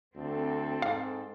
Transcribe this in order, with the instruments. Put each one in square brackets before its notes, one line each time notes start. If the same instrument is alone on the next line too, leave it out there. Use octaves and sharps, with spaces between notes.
[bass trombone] D2 [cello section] C4 A4
[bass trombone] G#2 [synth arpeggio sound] F5